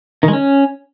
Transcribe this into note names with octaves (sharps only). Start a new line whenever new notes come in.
D#3
G#3
C#4